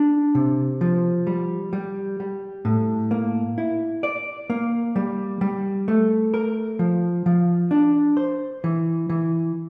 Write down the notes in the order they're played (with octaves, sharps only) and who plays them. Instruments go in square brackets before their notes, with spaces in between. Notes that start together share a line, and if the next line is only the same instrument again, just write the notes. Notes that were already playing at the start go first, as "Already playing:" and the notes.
Already playing: [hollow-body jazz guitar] D4
C3
F3
G3
G3
G3
A2
A#3
E4
D5
A#3
G3
G3
A3
A#4
F3
F3
D4
C5
E3
E3